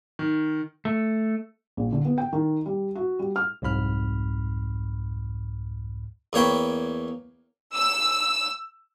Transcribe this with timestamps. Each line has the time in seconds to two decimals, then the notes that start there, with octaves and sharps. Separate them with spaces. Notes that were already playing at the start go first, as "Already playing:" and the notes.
0.19 D#3
0.85 A3
1.77 A#1
1.92 D3
2.05 B3
2.18 G5
2.33 D#3
2.66 G3
2.95 F#4
3.19 G3
3.36 F6
3.62 C2 F2 G#2 B5 F6
6.33 E2 A#3 C#5 G5 B5
7.74 E6